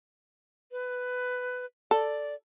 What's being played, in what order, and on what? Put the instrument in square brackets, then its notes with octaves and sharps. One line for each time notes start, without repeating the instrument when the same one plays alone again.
[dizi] B4
[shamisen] A4 [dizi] D5